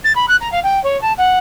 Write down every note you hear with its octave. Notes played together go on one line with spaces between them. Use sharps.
A6
B5
F#6
A#5
F5
G5
C#5
A5
F#5